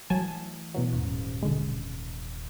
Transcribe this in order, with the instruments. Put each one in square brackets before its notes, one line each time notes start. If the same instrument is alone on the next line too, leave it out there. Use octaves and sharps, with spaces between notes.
[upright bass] E3 A3 [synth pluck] F#3 G#5 A5
[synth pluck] B2 E3 F#3
[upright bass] D#1 G#2
[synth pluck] B1 D3 G#3